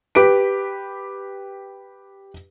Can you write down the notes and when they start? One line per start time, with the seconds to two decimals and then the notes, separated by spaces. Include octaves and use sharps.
0.15 G4 B4 D7